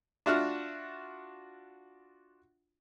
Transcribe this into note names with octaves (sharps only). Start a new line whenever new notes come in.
D4 F4 F#4 E5 F#5 F6